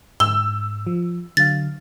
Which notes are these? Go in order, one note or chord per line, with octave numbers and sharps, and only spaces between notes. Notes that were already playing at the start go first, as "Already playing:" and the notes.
G#2 E6 G7
F3
D3 F#3 F5 A6